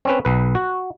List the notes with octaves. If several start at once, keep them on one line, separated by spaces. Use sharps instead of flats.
C4 C#4 B4
B1 B4
F#4